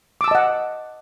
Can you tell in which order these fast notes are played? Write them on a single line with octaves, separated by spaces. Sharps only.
D6 E6 A5 D#5 F#5